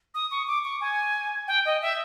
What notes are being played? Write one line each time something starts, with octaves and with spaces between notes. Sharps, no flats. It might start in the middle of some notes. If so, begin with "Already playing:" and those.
D#6
C#6
D6
C#6
G#5
G5
D#5
E5